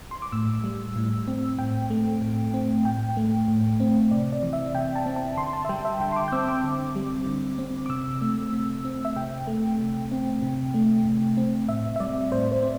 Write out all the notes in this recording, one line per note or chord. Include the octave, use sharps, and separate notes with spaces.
C6
D6
A2 E6
G3
A2
C4
A2 G5
A3
A2
C4
A2 G5
A3
A2
C4
C3 D5
D5
E3
E5
C3 G5
A5
C4
A5
D3 C6
A5
E5
G3 G5
E5
D3 G5
C6
D6
G6
C4 E6
D6
D3
G3
D3
C4
D6
C3 E6
A3
C3
C4
E5
C3 G5
A3
C3
C4
C3
A3
C3
C4
A2 E5
E5
G3 D5
A2 C5
C5
C4